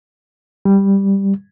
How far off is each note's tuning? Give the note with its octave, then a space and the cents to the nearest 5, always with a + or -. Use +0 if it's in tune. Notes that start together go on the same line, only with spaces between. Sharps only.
G3 +5